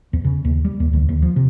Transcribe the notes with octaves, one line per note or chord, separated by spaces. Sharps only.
E2
C#3
D#2
G3
D#2
D2
D#2
F3
C3